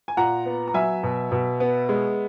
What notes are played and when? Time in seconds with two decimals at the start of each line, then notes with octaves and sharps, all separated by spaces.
0.08 G#5
0.17 A#2 F#5 A#5
0.46 B3
0.68 A#5
0.74 F#3 E5 G#5
1.03 B2
1.32 B2
1.60 B3
1.89 G#3